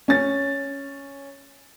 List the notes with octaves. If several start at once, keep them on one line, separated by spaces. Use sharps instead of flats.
C#4 A6